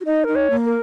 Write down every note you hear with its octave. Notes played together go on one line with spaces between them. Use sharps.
F#4
D#4 D#5
D#4 A#4
C#5
A#3
A#4